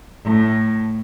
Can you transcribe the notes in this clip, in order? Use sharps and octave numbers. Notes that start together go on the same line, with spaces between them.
A2